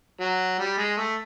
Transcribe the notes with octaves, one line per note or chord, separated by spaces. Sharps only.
F#3
G3
G#3
A3